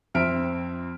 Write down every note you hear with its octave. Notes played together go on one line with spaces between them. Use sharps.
F2 C4 E5 F6 D7